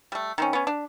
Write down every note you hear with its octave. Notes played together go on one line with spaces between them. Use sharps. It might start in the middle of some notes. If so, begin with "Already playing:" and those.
G3 A3
D#3 C4 C#4
B3 C#4
D4